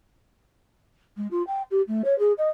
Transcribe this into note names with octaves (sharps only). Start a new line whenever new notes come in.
G#3
F4
G5
G4
A3
C#5
G#4
D#5